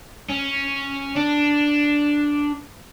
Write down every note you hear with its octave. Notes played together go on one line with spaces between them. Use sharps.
C#4
D4